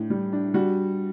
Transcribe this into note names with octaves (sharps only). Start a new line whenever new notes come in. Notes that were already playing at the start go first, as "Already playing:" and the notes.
Already playing: A2 D4
G3
D4
G3 F#4